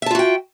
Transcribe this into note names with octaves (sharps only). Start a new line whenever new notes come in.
F4 F#4 E5 G5 A5